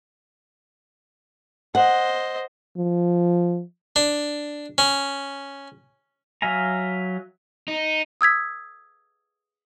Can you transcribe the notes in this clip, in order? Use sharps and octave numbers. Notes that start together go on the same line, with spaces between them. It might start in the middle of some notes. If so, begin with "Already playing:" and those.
C5 D#5 F#5
F3
D4
C#4
F#3 E5 F5 G#5 A#5
D#4
D#6 E6 G#6 B6